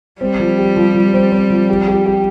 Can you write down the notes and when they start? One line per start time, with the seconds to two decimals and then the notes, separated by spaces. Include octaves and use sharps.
0.21 G3 C4
0.39 F3
0.58 G4
0.77 F3
0.95 F3
1.14 C4
1.32 C4
1.50 F3
1.69 G4
1.88 G4
2.06 G4